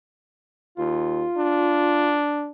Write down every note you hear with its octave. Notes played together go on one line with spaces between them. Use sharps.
D#2 F4
D4